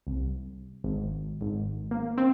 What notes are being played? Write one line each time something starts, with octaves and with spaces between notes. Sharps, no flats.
C2
G#1
G#1
A#3
C4